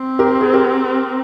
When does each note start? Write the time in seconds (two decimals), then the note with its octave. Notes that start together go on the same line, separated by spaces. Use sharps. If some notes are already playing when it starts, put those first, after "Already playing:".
Already playing: C4
0.19 G4 A#4
0.41 G#4
0.53 G4 A#4